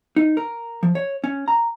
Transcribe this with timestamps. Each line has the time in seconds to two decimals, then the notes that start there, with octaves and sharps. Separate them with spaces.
0.16 D#4
0.37 A#4
0.83 F3
0.95 C#5
1.24 C#4
1.48 A#5